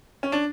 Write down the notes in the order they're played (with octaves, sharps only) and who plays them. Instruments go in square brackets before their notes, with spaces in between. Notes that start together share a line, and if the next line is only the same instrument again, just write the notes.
[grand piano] C#4
D4